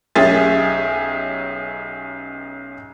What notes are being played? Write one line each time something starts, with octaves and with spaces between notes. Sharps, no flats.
B1 C#4 G4 G#4 E5 A6